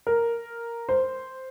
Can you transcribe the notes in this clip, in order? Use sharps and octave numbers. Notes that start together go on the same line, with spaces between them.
A#4
C5